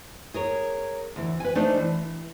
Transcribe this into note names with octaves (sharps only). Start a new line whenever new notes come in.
G#4 A#4 C#5
D2 E3
B4 G#5
A3 D4 D#4 C5 D5
E3